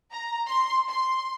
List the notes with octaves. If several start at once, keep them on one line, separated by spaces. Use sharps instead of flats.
A#5
C6
C6